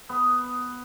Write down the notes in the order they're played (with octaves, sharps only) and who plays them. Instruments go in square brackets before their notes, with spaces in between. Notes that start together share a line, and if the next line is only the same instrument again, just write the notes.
[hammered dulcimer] B3